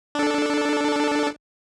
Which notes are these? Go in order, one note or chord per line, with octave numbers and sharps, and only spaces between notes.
D4 A4